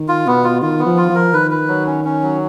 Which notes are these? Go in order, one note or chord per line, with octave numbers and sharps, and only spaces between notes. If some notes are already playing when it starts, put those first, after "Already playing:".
Already playing: D#3
F4
B2 B3
F4
D#3 F4
B3
F3
F4
F3
A#4
D#3 B4
B4
F#3
C#4
C#4
F#3